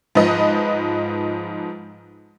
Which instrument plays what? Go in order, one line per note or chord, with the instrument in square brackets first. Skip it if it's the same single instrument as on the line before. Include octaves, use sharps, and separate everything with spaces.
[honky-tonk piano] G#2 F3 B4 D#5